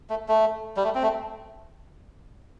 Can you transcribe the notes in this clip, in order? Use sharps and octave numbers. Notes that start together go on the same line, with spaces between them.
A3
A3
G3
A3
C4
A3